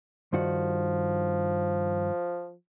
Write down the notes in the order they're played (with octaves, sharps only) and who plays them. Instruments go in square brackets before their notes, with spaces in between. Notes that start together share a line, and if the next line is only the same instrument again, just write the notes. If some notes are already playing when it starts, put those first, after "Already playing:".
[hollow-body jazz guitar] G2 D#3 F#4 [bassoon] F3